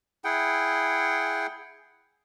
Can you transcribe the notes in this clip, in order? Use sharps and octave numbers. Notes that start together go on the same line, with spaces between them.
E4 G#4 F#5 G5